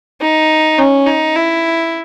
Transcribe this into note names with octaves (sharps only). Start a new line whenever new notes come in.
D#4
C#4
D#4
E4